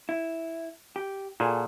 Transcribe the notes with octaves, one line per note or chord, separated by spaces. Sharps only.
E4
G4
A#2 F#4 G#4 A4